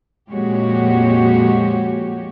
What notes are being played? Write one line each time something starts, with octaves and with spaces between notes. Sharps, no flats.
F2 A#2 G#3 F#4 G4 C#5